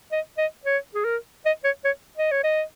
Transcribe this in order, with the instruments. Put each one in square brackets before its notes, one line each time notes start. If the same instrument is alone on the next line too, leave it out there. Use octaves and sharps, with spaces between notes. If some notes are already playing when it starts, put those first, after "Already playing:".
[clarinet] D#5
D#5
C#5
G#4
A#4
D#5
C#5
C#5
D#5
C#5
D#5